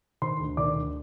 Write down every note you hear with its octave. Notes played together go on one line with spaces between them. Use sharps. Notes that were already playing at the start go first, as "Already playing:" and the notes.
D#3 C5 C6
D2
D#3 D5 D6
D2